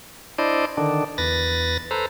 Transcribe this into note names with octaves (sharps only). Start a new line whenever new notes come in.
D4 E4 C5 D5 D#5
D3 D#3 D4
E2 B4 A6 A#6
A4 B4 C5 A#5